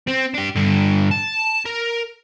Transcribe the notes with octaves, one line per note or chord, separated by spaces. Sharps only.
C4
D4 G4
G2 D3
A5
A#4